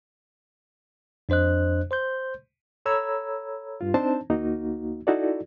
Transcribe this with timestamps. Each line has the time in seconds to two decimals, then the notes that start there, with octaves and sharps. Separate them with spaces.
1.29 F2 D4 C5 D#5 F#6
1.91 C5 C6 G6
2.86 A4 C#5 A#5 B5 E6 G#6
3.81 G2 F4
3.94 C4 D4 D#4 C5 A5
4.30 D2 A#3 D#4 F#4
5.07 D#4 E4 F#4 A4 D5